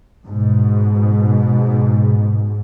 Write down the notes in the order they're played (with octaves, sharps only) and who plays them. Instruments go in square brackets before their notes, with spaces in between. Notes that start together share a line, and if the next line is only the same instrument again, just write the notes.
[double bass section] G#2 B2